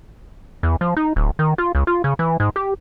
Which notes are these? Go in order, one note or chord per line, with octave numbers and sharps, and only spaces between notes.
E2
F3
D#4
D1
D#3
F4
C#2
F4
C#3
E3
G#2
G4